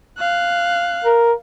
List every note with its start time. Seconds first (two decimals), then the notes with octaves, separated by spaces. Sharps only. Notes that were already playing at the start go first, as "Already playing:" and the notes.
0.18 F5 F#6
1.05 A#4